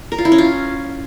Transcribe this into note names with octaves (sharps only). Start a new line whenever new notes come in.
A#4
F4
E4
C#4
F4